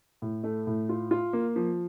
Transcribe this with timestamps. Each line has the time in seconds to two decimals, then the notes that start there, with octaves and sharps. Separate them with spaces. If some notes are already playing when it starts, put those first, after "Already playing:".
0.22 A2
0.44 A3
0.67 A2
0.89 F4
1.11 F4
1.33 A#3
1.56 F3